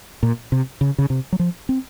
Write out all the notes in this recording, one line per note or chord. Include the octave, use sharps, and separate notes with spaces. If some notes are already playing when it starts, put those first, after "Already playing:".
A#2
C3
C#3
C#3
C3
F#3
F3
C4